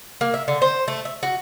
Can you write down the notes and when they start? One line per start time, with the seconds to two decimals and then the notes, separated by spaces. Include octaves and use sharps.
0.21 A#3
0.34 E5
0.48 D3
0.62 C5
0.88 A3
1.05 E5
1.23 F#4